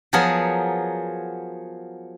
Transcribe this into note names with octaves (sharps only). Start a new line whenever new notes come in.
F3 F#3 B3 G#4 A#4